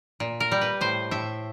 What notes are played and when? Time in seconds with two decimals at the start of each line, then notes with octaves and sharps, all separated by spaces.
0.20 A#2
0.40 A#4
0.52 G3
0.61 B4
0.81 A2 C5
1.11 A2 E5